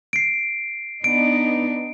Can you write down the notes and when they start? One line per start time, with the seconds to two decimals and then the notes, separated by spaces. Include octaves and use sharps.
0.13 C7 D7
1.04 B3 D4 D#4 D7